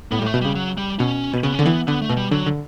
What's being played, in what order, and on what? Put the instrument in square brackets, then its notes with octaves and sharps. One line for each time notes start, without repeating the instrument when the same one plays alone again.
[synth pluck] A2 [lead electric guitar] B3
[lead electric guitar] G3
[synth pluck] A2 [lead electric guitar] A3
[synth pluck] B2
[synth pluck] C#3 [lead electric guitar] G3
[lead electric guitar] F#3
G3
[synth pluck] B2 [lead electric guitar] C#4
[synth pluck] B2
[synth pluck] C#3 [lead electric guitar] B3
[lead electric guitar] C#4
[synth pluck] D3
[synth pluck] E3 [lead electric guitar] B3
[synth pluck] D3 [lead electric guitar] B3
[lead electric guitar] A3
[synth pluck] B2
[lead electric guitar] G3
[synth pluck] D3 [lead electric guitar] F#3
[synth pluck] D3